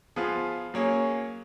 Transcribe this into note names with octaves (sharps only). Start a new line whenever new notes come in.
F3 B3 F4 G#4
F#3 A#3 C#4 G#4